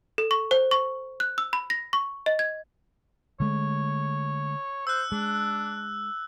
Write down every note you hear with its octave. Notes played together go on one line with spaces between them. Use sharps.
A4
C#6
C5
C#6
F#6
E6
B5
A#6
C#6
D#5
G#6
D3 G#3 A3 C#5
C5 E6 F#6
G#3 D4